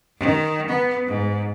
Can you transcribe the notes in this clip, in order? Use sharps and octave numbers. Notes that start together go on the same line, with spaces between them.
D#3
B3
G#2